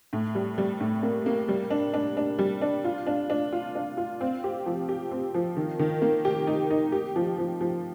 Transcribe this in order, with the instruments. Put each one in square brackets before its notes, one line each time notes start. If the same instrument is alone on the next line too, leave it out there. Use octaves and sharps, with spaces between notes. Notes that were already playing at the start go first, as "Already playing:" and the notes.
[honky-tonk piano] A2
G3
G3
A2
A#3
A#3
G3
D4
D4
D4
G3
D4
F4
D4
D4
F4
D4
F4
C4
G4
F3
G4
C4
F3
D#3
D#3
A#3
G4
D#4
D#4
G4
F3
F3
F3